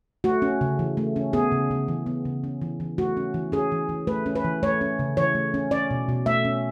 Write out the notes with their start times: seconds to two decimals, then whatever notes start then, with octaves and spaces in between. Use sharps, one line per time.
0.24 A3 F#4
0.42 C#4
0.61 C#3
0.79 E3
0.97 A3
1.16 C#4
1.33 B3 G#4
1.52 C#3
1.71 C#3
1.88 E3
2.06 B3
2.25 C#3
2.44 C#4
2.61 E3
2.80 E3
2.98 A3 F#4
3.17 C#4
3.34 E3
3.52 C#4 G#4
3.72 E3
3.89 E3
4.07 A3 B4
4.26 C#4
4.36 B4
4.44 E3
4.63 A3 C#5
4.81 C#4
4.99 C#3
5.17 E3 C#5
5.35 A3
5.54 C#4
5.71 C#4 D5
5.91 B2
6.09 B2
6.26 A3 E5
6.45 C#4